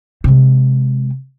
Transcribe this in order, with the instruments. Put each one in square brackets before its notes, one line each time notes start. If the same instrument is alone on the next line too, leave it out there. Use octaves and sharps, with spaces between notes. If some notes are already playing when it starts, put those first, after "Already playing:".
[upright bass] C3 G#3